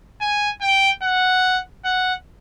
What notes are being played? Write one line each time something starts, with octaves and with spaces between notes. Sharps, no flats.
G#5
G5
F#5
F#5